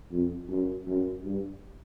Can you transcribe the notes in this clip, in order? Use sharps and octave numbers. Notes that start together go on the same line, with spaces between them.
F2
F#2
F#2
G2